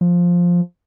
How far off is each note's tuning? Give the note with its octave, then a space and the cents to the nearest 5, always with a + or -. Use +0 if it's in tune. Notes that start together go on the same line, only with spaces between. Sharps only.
F3 +5